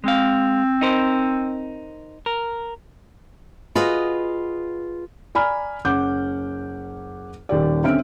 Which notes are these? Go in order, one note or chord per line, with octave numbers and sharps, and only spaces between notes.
G#3 C4 F5
D#4 A#4 C5
A#4
F4 F#4 G#4 B4 D#5
D5 G#5 A#5 B5 F6
F#1 C#4 F#5 D6 G6
D#1 D#2 G4 D5
D3 C4 C#4 E5 F6 D7